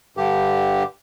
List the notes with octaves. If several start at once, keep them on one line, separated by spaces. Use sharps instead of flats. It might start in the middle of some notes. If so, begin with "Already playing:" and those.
G2 D3 G4